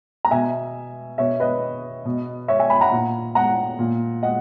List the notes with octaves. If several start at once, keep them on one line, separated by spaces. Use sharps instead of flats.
A#5
B2 E5 G#5
B2 C#5 E5
B4 D#5
B2
C#5 E5
E5 G#5
G#5 B5
F#5 A#5
A#2
F#5 A#5
A#2
D#5 F#5